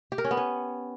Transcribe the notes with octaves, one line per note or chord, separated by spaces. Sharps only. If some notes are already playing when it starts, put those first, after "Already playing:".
G4
A#4
C#4
B3
C#4